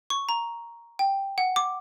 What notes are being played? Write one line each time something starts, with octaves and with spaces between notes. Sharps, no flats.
C#6
A#5
G5
F#5
D6